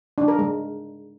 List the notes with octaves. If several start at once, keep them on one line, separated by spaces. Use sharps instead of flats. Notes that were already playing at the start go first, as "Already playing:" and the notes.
D4
A#4
G#3